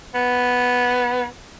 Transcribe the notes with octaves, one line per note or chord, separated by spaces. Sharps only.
B3